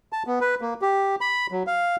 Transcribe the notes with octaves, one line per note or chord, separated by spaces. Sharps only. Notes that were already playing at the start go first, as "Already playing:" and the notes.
A5
B3
B4
A#3
G4
B5
F#3
F5